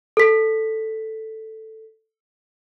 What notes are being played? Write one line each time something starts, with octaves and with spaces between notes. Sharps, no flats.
A4 B6